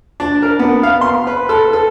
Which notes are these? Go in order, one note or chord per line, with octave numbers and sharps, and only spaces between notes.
D4
A#4
B3
F5
C6
B4
A4
A4